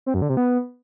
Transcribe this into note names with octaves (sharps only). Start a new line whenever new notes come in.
C4
F#2
D3
C3
B3